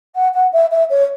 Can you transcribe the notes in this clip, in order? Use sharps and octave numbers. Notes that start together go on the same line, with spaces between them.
F#5
F#5
E5
E5
C#5